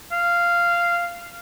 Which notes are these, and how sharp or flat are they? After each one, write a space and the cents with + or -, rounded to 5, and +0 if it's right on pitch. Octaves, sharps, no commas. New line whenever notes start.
F5 -10